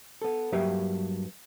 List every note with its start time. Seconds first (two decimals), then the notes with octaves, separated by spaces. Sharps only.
0.22 B3 A4
0.52 G2 F#3 A#3 G4 B4 E5